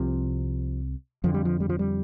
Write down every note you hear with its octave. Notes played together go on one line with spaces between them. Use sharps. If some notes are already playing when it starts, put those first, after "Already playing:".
Already playing: C2 C3 F3
F2 D3 F3
G3
F3
G3
F3
G3